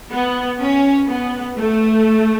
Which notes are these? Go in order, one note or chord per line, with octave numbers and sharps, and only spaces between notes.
B3
C#4
B3
A3